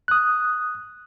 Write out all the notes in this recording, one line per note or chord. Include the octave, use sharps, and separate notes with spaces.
D#6 F#6